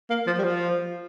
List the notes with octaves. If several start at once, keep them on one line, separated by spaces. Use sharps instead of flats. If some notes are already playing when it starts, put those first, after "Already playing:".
A#3
F3
G3
F3